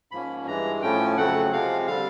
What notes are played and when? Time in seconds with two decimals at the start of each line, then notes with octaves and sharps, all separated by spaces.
0.11 G#2 F3 A#3 C#4 B5
0.47 G2 E3 G#3 A#5
0.82 A2 F3 A3 C#4 G5
1.17 F2 C#3 F#3 A3 C4 F#5
1.52 C3 F3 G#3 C4 F5
1.87 D3 G3 F5